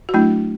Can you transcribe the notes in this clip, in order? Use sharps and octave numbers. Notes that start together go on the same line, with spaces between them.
F#4
F#3 A3 D4 E4